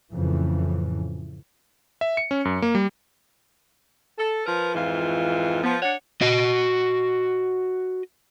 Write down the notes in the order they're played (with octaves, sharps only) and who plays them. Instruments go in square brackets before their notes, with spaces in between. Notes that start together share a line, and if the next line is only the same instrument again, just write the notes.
[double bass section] F2 A2 C#3 E3
[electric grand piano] E5
C#7
C#4
F#2
A#3
G3
[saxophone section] A4
F3 A#4 B4
F2 G#2 E3 F4
F3 B3
D4 C#5 F#5
[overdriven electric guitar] F#4 D#5